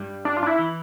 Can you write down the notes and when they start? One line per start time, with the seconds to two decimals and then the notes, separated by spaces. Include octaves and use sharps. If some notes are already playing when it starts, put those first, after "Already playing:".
Already playing: G2 G3
0.25 D4
0.37 F4
0.43 D4
0.47 E4
0.59 E3